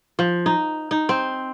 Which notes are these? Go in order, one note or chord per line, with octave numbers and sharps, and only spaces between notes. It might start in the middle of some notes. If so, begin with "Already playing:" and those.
F3
D#4
D#4
C4